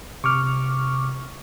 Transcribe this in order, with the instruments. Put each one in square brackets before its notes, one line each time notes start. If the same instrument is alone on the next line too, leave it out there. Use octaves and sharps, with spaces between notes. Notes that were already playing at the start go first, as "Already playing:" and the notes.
[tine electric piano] C3 [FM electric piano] C#6 D6 F6